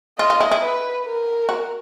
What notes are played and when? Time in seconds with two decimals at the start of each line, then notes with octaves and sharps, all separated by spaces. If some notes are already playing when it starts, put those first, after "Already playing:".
0.19 F4 D#5
0.30 F4
0.40 E4
0.51 E4
0.62 B4
1.06 A#4
1.49 F#4